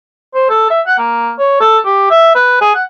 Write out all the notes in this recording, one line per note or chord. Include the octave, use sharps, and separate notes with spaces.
C5
A4
E5
F#5
A#3
C#5
A4
G4
E5
B4
G#4
F#5